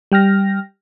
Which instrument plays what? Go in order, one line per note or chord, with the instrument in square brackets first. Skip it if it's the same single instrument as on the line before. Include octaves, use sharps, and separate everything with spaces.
[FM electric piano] G3 G5 F6 A#6